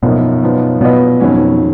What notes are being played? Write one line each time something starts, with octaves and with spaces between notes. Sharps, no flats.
F#2 B2 F3 A#3 D#4
F#2 F3 B3 D#4
B2 F#3 B3 F4 B4 D#5
F2 D#3 F#3 C#4